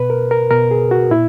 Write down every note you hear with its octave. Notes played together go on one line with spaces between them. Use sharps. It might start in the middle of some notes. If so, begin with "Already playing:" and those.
Already playing: B2 B4
A#4
A#4
B2 A#4
G#4
F#4
A#2 E4